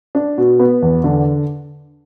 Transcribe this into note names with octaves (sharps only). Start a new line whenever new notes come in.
D4
B2
B3
E2
D3